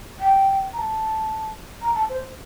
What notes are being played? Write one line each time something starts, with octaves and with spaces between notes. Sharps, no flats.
G5
A#5
A5
A#5
A5
C5